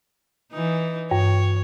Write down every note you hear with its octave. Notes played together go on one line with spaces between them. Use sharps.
E3 D#4
G2 C#5